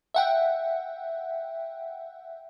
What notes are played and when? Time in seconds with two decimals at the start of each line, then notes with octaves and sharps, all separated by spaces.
0.14 E5 F#5 G5